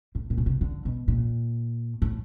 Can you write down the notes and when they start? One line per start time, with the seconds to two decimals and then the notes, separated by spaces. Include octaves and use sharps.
0.15 A2
0.30 A#2
0.38 C#3
0.46 C3
0.61 D3
0.85 B2
1.08 A#2
2.02 A2